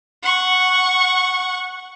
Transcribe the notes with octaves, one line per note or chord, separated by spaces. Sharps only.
F#5 C#6